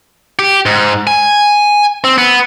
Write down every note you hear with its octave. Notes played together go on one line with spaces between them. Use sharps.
G4
G#2
G#5
C4
B3